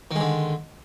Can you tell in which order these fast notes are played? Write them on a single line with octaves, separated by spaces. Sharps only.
D#3 G#3 D3